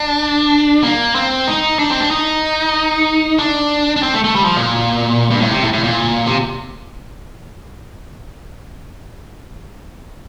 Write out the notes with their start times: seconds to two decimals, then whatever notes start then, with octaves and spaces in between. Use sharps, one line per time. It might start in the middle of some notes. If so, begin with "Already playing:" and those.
Already playing: D4
0.83 A#3
1.15 C4
1.47 D#4
1.79 D4
1.90 C4
2.00 D4
2.11 D#4
3.39 D4
3.96 D4
4.03 C4
4.14 A3
4.24 A3
4.35 G3
4.45 F3
4.56 A#2
5.30 G2
5.41 A2
5.51 C3
5.62 A2
5.73 A2
5.84 A#2
6.26 C3